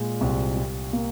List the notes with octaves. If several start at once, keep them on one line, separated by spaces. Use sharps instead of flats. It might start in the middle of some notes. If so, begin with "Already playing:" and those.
Already playing: A#2 G#3
C2
G3
A#3